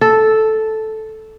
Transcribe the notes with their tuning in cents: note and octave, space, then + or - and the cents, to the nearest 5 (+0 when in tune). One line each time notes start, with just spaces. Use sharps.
A4 -5